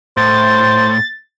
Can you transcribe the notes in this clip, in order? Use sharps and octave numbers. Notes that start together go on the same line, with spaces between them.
A2 C5 A6